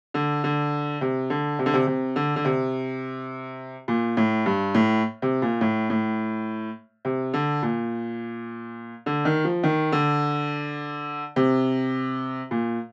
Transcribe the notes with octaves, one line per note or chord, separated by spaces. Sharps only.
D3
D3
C3
D3
C3
D3
C3
C3
D3
D3
C3
A#2
A2
G2
A2
C3
A#2
A2
A2
C3
D3
A#2
D3
D#3
F3
D#3
D3
C3
A#2